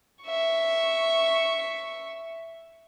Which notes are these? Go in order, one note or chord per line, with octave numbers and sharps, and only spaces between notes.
E5 C#6